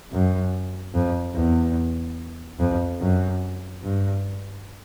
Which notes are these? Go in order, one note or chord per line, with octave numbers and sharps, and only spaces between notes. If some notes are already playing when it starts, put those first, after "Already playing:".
F#2
F2
E2
F2
F#2
G2